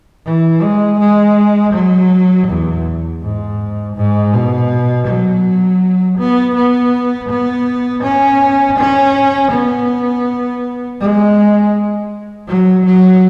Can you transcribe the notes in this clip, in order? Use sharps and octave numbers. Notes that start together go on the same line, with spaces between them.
E3
G#3
G#3
F#3
E2
G#2
G#2
B2
F#3
B3
B3
B3
C#4
C#4
B3
G#3
F#3
F#3